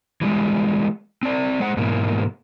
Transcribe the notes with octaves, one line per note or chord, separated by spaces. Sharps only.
E3 G3 G#3
C4 D5
G#3 C5 F#5
G#2 B2 E3 A#3